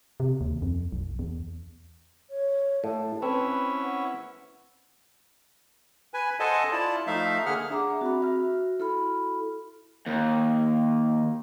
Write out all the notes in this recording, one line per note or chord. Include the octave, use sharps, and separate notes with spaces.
C3
D#2
F2
B1
E2
C#5
A2 A5
C4 C#4 E4 B4
F#5
B4 G#5
A4 C5 D#5 F#5 G#5 A5
E4 F4 D5 A5
F3 A3 D#4 E5 F5
D3 A#3 G#4 F#5 F6
D4 G#4 E5 F#5 A#5 D6
C4 F#4 B5
E5 F6
E4 F#4 A4 B5 F6
D#2